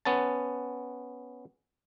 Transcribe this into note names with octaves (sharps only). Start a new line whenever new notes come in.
B3 C#4 A5